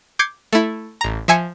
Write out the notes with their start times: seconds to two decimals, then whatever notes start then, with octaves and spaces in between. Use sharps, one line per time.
0.19 D6 G6 G#6 C7 C#7
0.53 A3 E4
1.01 A1 A#5
1.28 F3 E5 G#5 G#6 C#7